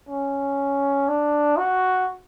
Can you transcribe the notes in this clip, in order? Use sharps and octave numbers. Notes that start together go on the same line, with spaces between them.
C#4
D4
F#4